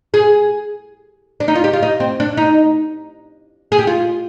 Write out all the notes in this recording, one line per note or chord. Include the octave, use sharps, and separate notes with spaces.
G#4
D4
D#4
F4
G4
F4
D#4
C4
D4
D#4
G#4
G4
F4